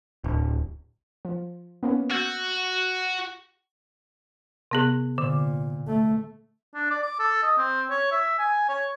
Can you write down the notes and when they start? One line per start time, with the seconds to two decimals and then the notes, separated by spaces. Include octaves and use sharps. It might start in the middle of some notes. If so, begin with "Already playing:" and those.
0.24 D1
1.25 F3
1.83 A#3 B3 C#4
2.11 F#4 E6 G6
4.71 C3 B3 G#4
5.18 A#2 D3
5.88 A3
6.75 D4
6.90 D5
7.03 D6
7.19 A4
7.42 D#5
7.57 C4
7.90 C#5
8.11 E5
8.39 G#5
8.68 C#5